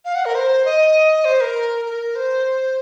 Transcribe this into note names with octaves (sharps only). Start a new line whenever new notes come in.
F5
F#5
A#4
C5
D#5
C5
A#4
A#4
C5